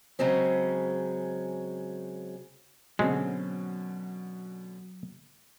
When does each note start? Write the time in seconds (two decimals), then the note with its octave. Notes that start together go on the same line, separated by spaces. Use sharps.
0.19 C#3 F#3 G#3 C4 C#4
2.99 B2 D3 F#3 G#3 C4 C#4